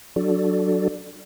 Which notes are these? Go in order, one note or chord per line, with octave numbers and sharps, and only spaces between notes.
F#3 D4 F#4 A4 D5